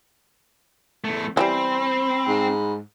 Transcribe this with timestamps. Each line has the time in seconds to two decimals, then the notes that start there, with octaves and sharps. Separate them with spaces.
1.04 E2 A3
1.37 E3 F3 G3 C4 B5
2.28 G#2